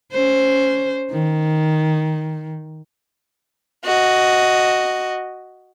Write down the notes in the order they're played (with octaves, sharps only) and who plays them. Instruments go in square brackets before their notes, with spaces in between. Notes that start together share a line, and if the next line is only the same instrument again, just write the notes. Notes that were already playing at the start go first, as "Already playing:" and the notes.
[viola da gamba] C#4 C5
D#3
[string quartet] F#4 D#5